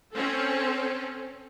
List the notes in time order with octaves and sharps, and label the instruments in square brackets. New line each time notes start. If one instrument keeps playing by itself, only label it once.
[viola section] C4 C#4 A4